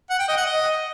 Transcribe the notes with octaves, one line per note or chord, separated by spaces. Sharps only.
F#5
G5
D#5
F#5
D#5